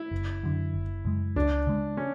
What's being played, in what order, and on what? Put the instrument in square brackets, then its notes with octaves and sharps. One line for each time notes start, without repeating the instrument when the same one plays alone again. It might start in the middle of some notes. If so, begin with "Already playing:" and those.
Already playing: [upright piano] E4
[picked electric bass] F#1
F#2 D3
F#1
F#2 C#3 G#3
[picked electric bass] C#2 [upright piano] D4
[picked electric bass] C#3 G#3
[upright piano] C#4